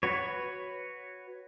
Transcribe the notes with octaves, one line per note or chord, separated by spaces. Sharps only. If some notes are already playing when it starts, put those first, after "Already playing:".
F#4 B4 C#5